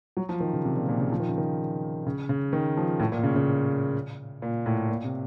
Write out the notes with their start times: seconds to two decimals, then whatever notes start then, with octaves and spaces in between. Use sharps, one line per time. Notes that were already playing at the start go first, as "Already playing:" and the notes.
0.17 F#3
0.29 F3
0.40 D#3
0.53 C#3
0.65 C3
0.76 A#2
0.89 A#2
1.00 C#3
1.12 F3
1.20 D#3
1.29 C#3
1.38 D#3
2.06 C#3
2.29 C#3
2.53 D#3
2.77 F3
3.00 A2
3.12 A#2
3.24 C#3
3.36 C#3
4.42 A#2
4.66 A2
4.89 A#2
5.04 C3